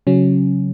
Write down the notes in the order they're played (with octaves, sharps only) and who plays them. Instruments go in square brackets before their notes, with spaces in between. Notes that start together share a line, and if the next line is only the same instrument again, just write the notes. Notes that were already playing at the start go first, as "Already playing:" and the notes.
[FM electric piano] C#3 F#3 C#4